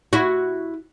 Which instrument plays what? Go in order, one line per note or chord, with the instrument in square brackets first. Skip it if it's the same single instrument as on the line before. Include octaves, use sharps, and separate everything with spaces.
[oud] E4 F#4